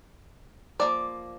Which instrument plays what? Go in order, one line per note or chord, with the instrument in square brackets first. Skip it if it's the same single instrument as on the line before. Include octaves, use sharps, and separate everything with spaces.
[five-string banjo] F3 A#3 D5